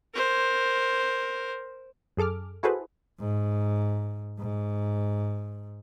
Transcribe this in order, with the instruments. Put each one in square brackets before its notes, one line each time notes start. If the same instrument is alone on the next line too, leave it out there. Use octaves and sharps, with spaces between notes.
[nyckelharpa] A#4 C5
[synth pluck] F#2 G#4 A4 D6 F6
E4 F#4 G#4 A4 B4 C5
[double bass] G#2
G#2